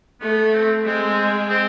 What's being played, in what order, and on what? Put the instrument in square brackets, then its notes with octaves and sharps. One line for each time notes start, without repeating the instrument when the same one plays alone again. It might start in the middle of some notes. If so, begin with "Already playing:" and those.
[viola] A3 [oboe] B3
[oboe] C4
[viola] G#3 [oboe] C4
[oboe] C4